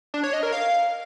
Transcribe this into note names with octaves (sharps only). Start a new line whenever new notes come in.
D4
C#5
D#5
A#4
F5